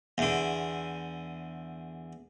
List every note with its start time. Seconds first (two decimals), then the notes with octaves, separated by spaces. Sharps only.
0.18 E2 D3